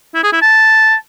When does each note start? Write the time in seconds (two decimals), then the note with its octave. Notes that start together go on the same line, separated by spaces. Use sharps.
0.14 E4
0.23 G#4
0.33 E4
0.42 A5